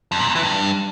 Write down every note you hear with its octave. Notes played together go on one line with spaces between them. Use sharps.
F2
A#2
E2
E3
G2